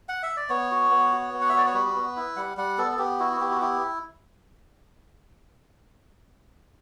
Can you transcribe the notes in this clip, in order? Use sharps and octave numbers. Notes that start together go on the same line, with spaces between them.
F#5
E5
D5
B3 C#5
F#4
B3
F#4
B3
F#5
E5
F#4 D5
C#5
G3 B4
B3
E4
G3 F#5
G3 F#5
B3 A4
A4
B3 G4
E4 F#4
F#4
B3 G4
F#4
E4 G4